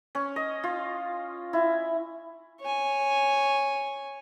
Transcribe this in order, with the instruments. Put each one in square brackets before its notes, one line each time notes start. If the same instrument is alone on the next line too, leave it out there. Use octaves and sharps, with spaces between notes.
[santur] C#4
D#5
F4
E4
[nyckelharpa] C#5 G#5